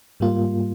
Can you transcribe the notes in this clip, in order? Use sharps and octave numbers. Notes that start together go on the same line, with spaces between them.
G#2 G3 A#3 F4